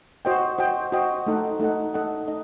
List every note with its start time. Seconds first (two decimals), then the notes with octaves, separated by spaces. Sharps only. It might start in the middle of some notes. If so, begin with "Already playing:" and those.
0.25 F#4 C5 D#5 G5
0.58 F#4 C5 D#5 G5
0.92 F#4 C5 D#5 G5
1.26 A3 D#4 A4 D#5 F#5
1.60 A3 D#4 A4 D#5 F#5
1.94 A3 D#4 A4 D#5 F#5
2.28 D#4 D#5